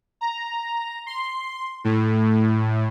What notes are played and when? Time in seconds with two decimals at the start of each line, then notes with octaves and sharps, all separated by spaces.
0.21 A#5
1.07 C6
1.84 A2